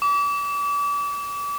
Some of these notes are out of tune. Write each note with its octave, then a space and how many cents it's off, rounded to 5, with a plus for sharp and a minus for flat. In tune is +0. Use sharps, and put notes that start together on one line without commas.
D6 -35